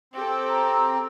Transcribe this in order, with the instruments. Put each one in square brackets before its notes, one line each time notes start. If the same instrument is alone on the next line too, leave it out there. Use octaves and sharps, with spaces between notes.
[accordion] C4 [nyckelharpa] G4 A4
[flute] A#5